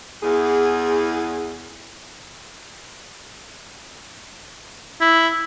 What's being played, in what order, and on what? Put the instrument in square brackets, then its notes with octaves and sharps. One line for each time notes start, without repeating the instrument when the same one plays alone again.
[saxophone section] E2 G#4
[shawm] E4